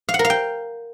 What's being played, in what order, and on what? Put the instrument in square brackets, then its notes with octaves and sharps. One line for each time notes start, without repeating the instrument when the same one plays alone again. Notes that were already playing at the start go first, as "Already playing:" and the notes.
[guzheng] F5
F#5
A#4
F5
G5